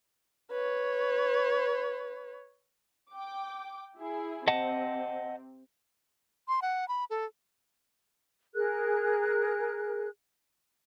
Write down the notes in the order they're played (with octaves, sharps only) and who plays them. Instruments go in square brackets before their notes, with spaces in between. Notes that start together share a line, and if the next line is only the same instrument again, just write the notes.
[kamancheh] B4 C#5
[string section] G5 D6
E4 G#4
[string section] C3 C4 [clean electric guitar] D#5 F#5 A5
[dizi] C6
F#5
B5
A4
[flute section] G#4 A#4 F#6